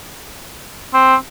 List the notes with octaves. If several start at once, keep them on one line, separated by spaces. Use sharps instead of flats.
C4